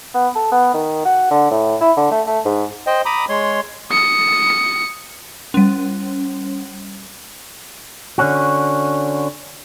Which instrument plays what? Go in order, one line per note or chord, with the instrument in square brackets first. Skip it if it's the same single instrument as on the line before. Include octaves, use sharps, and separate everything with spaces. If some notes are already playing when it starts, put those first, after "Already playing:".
[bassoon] B3
A4
B3
D#3
F#4
D3
A2
E4
D3
A3
A3
G#2
[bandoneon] C5 D#5 G5
A#5 B5 D6 D#6
G#3 C#5 C6
[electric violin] D#6 C#7
[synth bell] G3 C#4
[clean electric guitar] D3 C#4 F#4